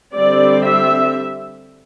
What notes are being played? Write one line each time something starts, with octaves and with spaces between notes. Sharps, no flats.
D3 G3 C4 D5
E5